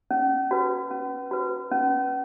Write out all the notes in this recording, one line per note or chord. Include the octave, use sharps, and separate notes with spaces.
C#4
F#4 B4
C#4
F#4 B4
C#4